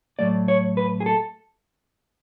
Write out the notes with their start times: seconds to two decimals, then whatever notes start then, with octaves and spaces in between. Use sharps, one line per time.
0.19 A2 F#3 A3 D5
0.48 C#5
0.77 B4
1.00 G#4
1.06 A4